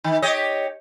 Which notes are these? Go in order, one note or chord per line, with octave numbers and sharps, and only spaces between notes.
D#3
G4 C#5 D#5